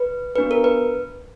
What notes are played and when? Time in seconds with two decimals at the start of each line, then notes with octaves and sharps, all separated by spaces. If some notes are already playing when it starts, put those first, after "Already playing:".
Already playing: B4
0.36 B3 D4 F#4 B4
0.51 A#4
0.64 B4